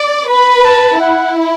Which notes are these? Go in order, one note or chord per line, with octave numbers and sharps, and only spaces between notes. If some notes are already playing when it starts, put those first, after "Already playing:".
Already playing: D5
B4 B5
A5
E4 F#5